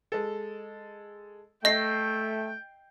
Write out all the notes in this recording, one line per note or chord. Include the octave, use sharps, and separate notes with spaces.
G#3 A4
A3 D#5 G5 G6 A#6 C7